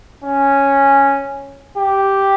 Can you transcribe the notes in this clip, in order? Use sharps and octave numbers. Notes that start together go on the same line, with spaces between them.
C#4
G4